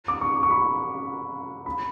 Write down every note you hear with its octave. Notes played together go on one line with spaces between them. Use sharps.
D6
C#6
C#6
B5
B5